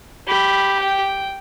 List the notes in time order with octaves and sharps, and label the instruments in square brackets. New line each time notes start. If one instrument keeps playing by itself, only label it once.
[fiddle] G4 [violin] B5
[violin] G5